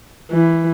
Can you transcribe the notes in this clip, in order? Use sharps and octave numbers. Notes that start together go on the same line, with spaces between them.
E3